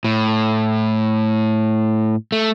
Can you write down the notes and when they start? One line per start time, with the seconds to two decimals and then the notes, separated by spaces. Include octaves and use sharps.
0.04 A2
2.32 A3